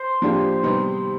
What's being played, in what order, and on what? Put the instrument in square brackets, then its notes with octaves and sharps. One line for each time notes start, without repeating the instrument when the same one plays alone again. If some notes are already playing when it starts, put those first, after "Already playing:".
Already playing: [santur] C5
[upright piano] F3 A#3 D4 G4
C3 D#3 G3 B3 D#4